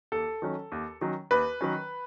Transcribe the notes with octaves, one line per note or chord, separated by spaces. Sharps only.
D#2 A4
D#3 F#3 C#4
D#2
D#3 F#3 C#4
D#2 B4
D#3 F#3 C#4